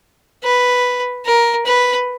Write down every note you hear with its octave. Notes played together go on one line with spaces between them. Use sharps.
B4
A#4
B4